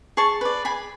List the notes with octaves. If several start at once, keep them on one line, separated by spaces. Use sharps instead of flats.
G#4 A5 C#6
B4 D5
G#4 G#5 B5